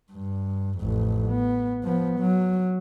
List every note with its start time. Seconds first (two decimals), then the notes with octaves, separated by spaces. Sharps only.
0.12 G2
0.78 A1 F2
1.27 B3
1.83 F3 B3
2.20 F#3